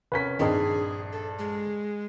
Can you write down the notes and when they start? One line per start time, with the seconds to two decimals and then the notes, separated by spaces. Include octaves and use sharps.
0.12 F1 C#4 A#4 B4 B6
0.39 A#1 G2 D#3 C4 D#4 G#4
1.12 A4
1.39 G#3